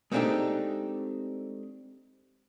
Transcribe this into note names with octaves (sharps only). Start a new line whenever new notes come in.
G#3 A3 C4 D4 D#4 G4